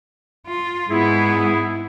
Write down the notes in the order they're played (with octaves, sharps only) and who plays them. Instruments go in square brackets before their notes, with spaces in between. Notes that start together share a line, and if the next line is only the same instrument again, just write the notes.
[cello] F4
[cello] G#2 B3 [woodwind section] E4 G#4